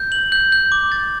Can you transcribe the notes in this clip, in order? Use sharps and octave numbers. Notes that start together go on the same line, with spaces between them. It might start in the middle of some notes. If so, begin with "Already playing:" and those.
Already playing: G6
F#7
G6
G6
D6
A6